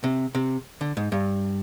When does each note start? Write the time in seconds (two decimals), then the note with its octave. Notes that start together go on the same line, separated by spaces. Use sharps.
0.04 C3
0.35 C3
0.81 D3
0.97 G#2
1.12 G2